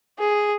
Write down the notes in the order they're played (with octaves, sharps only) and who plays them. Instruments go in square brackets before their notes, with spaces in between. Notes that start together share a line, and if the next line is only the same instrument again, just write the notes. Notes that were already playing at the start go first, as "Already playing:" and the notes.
[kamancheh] G#4